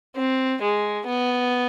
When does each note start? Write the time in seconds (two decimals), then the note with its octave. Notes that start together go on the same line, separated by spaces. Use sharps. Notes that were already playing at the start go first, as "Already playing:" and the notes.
0.16 C4
0.61 G#3
1.07 B3